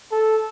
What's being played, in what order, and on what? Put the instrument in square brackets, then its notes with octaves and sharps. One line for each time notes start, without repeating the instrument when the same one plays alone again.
[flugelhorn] A4